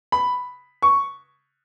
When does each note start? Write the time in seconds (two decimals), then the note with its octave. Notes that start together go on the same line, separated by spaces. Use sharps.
0.12 B5
0.82 C#6